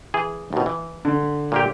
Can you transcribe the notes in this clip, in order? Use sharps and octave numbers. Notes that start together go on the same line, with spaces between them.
E3 G#4
D#2 B2
E3
D3
A#2 A#3 G4